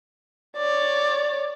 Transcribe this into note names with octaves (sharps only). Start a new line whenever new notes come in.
C#5 D5